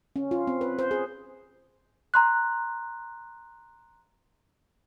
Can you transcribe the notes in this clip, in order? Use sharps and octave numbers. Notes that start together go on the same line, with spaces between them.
C#4
F4
C4
B4
C5
G#4
A#5 C6 F#6